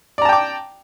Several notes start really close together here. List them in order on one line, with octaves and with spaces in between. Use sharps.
D5 A#5 A5 G5 D6